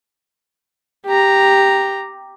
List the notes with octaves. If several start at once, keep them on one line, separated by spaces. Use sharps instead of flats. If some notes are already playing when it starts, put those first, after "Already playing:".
G4 A#5